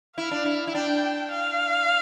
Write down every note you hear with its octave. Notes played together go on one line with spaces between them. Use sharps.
E4 F5
D4
E4
E4
D4 G5
F5